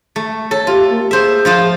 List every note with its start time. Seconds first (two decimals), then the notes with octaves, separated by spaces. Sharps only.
0.16 A3
0.51 A4 C#5
0.67 F4 G4
0.89 A#3
1.11 G#4 C5 E5
1.45 F3 F4 C5